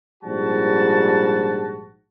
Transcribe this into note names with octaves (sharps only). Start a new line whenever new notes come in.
A#1 G#2 F3 G3 F#4 A5